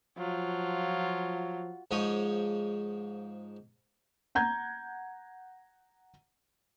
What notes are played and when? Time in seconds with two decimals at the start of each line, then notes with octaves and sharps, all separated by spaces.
0.18 F3 F#3 F4
1.91 G#2 F3 C#5 D#5
4.35 F#5 A#5 G6 G#6